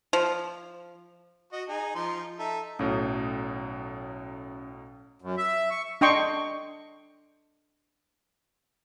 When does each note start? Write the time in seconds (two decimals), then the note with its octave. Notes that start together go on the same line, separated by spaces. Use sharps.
0.13 F3
1.53 F#4 D#5
1.69 D#4 G#4
1.95 F3 D#4 C6
2.39 D#4 A4 E5
2.79 B1 A2 F#3 C#4
5.22 F#2
5.38 E5
5.71 C#6
6.01 D4 D#5 G5 C6 C#6